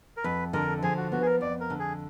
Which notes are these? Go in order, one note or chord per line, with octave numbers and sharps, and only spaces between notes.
A#4
F2 B4
D3 A#4
F3 G#4
F#4
B3 F#4
G#4
A#4
F2 D5
A#4
D3
G#4